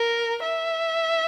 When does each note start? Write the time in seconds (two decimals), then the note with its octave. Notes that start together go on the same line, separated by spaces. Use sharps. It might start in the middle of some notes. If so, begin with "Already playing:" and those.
Already playing: A#4
0.43 E5